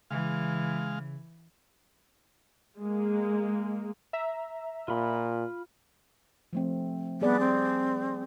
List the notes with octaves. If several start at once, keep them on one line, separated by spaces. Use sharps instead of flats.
C#3 E3 G#3 F5
G#3 A#3
E5 A#5
A#2 F4 B5
F3 A3 C4
G3 B3 G#4 D5
C4